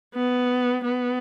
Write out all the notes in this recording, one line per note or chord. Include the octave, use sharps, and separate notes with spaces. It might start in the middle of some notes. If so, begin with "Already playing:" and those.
B3
B3